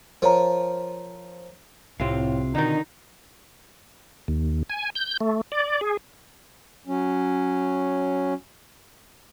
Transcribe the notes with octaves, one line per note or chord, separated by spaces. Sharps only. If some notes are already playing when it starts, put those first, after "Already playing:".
F3 A#4 C#5 A#5
C2 A2 C3 C4 F4 F5
B2 D3 D#3 D#4
D#2
G#5
G6
A3
D5
G#4
F#3 C#4